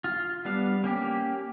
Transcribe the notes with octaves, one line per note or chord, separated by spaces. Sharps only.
F4
G3 B3 D4 F5
A#3 C#4 G4